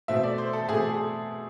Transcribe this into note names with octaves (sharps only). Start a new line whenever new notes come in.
B2 A3 C4 E5
D5
C5
A4
B2 A3 C4 G#4
G#4